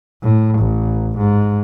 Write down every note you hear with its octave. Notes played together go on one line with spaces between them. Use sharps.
A2
A1
G#2